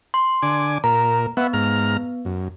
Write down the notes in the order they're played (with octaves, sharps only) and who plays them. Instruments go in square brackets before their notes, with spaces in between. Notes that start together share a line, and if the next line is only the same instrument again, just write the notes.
[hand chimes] C6
[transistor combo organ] D3 G#5 D6
[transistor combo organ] A#2 A#4 [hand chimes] A#5
[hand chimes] B3 [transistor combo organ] B4 E5 F#5
[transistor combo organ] G#2 A#5 F6
F#2